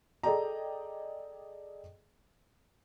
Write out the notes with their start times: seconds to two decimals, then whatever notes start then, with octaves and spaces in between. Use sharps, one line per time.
0.23 G#4 A4 D5 D#5 G5 A#5